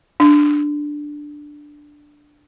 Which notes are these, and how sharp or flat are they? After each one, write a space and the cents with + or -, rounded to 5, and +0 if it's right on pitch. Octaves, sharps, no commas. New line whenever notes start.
D4 +5